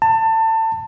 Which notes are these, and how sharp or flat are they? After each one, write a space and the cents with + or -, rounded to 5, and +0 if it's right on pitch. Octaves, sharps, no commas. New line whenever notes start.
A5 +25